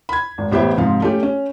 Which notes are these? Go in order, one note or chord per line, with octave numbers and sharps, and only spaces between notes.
B5 G#6
G#1
A1 B3 G4 C5 E5
G#2 C3 F3 F5
A3 C#4 G4
C#4